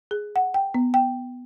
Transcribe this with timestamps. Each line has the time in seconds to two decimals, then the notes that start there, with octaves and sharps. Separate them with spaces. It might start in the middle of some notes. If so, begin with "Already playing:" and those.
0.11 G#4
0.36 F#5
0.54 G5
0.74 B3
0.94 G5